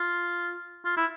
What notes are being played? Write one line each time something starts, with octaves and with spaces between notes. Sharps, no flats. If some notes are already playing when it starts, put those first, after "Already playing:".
Already playing: F4
F4
E4